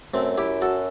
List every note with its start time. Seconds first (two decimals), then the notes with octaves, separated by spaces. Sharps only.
0.14 F#2 A3 C4
0.38 E4 G4
0.62 F#4 A4